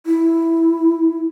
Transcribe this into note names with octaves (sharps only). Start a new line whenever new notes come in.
E4